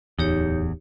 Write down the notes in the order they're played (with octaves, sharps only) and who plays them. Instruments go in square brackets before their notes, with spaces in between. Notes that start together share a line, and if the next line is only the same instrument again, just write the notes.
[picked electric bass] D1 E2 [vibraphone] D#4 G4 C#5